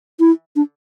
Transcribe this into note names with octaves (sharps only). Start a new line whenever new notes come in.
E4
D4